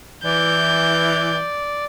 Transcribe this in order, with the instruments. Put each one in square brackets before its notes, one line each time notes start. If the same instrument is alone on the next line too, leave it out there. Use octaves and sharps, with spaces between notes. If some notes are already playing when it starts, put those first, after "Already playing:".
[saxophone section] E3 [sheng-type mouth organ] D5 [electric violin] G6